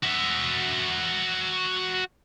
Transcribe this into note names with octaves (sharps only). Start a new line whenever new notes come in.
F#4 E5